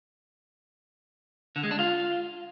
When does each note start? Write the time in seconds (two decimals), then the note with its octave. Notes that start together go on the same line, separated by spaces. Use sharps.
1.56 D3
1.63 G#3
1.71 D4
1.79 F4